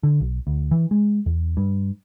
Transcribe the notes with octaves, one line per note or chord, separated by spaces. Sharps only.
D3
B1
D2
E3
G#3
E2
G2